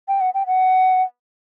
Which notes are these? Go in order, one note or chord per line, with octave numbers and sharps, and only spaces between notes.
G5
F#5
G5
F#5